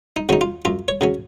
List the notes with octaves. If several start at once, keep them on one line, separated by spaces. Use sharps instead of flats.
D#4
C#3 F#3 C#4 D#4
F4
F#2 F4
C#5
C#3 F#3 C#4